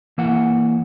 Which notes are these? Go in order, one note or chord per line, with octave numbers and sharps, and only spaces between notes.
E3 A#3 F#5